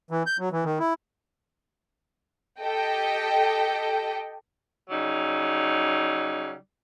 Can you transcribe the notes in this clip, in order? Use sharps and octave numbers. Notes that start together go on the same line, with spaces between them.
E3
G6
F#3
E3
D#3
E4
G4 A4 D#5 G5
C#3 F#3 G3 D#4